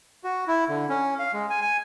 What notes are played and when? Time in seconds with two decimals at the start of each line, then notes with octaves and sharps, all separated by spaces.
0.24 F#4
0.48 E4
0.69 D3
0.89 C#4
1.19 F5
1.33 G#3
1.50 G#5
1.62 G#5